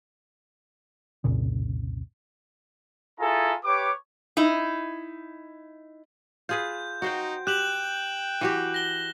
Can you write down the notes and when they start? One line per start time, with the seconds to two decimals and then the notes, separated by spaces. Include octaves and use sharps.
1.24 F1 C2 A#2 C#3
3.20 E4 F4 G#4 A4 G#5 A#5
3.64 G4 B4 C#5 D6
4.37 D#4 E4
6.49 F4 G#4 B4 G6
7.02 D#4 F#4 C5 G5
7.47 G4 G5 F#6 E7 F#7
8.41 E3 F#4 G4
8.74 A#6 G7